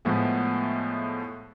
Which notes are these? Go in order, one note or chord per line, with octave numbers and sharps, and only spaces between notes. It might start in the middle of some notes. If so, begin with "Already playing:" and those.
A2 F3 G#3 A3 B3